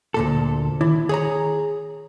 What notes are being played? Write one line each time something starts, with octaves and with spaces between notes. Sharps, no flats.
D2 A#2 A4
D#3 E4
G#4 C#5 A#5